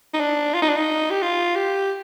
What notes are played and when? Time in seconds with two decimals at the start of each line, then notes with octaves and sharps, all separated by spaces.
0.14 D#4
0.20 D4
0.54 F4
0.62 D#4
0.69 D4
0.76 D#4
1.10 G4
1.22 F4
1.55 G4